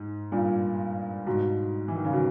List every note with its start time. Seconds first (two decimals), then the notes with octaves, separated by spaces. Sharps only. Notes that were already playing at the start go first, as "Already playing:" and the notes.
Already playing: G#2
0.32 G2 A#2
1.26 G#2 B2
1.88 E3
1.96 D#3
2.05 C#3
2.13 B2